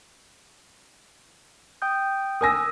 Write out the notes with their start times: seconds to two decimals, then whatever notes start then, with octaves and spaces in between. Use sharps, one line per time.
1.82 G5 D#6 G6
2.41 A#4 G#5 D#6 E6 A#6